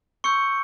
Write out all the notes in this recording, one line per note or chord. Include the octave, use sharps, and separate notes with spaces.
C6 C#6 E6 G6 C#7